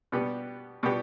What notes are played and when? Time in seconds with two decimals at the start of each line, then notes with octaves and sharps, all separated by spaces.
0.12 B2 G3 B3 D4 G4
0.83 B2 G3 B3 D4 G4